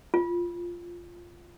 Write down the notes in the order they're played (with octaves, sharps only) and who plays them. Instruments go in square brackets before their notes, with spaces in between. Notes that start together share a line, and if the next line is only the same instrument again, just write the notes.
[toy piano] F4